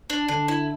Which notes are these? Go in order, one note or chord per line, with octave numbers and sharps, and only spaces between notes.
D4
D3 D4
E4